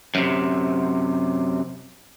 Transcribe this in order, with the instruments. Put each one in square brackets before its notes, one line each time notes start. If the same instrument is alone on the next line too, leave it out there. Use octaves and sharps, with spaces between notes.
[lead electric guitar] F#2 C3